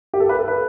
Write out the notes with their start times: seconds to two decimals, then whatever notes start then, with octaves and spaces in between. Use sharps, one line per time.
0.14 G4
0.20 A4
0.29 B4
0.39 A4
0.48 B4